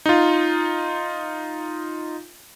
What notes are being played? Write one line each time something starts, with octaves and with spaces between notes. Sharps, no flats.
D#4 F4